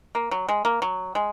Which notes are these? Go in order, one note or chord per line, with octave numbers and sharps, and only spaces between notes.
A#3
F#3
G#3
A#3
F#3
G#3